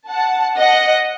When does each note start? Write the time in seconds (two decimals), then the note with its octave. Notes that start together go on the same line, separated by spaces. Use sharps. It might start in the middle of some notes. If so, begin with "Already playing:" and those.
0.10 F#5 A5
0.57 D#5 F#5